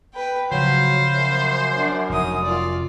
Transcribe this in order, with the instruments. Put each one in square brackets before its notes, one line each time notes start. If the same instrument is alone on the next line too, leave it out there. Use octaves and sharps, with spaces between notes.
[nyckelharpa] B4 G5
[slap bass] C#3 F3 [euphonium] F#3 [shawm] C5 [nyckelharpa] F5 B5
[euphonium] F#2
[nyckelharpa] D4
[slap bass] F1 [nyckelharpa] D#4 D#6
[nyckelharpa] F4 D5